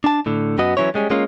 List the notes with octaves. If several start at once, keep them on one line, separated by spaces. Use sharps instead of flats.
D4 A5
A2 D3
F#2 B3 F#4 D#5
E3 F#3 C#4 E4 C#5
G3 G#3 C#4
G#3 A#3 C#4 F4